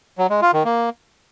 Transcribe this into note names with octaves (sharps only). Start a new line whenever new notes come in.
F#3
G#3
F4
D#3
A#3